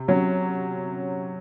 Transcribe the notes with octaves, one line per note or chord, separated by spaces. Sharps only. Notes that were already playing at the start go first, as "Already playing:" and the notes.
Already playing: C3
F#3 C#4